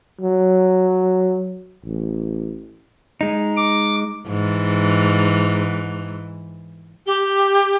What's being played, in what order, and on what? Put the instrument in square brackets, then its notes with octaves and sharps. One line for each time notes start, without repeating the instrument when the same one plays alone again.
[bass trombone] F#3
A1
[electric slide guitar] G#3 D#4
[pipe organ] D6
[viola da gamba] G#2 E3
[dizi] G4